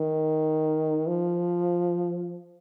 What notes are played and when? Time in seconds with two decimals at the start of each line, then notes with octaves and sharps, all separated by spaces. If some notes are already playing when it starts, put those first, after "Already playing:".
Already playing: D#3
1.07 F3